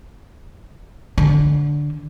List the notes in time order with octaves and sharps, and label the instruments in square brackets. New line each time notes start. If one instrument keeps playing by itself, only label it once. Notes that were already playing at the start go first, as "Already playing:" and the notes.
[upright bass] D3